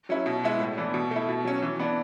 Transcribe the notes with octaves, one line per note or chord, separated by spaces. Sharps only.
F#3 C#4 E4
B2
G#3 B3 E4
A2
E3 B3 D4
B2
A3 E4
B2
F#3 C#4
E3
B3 D4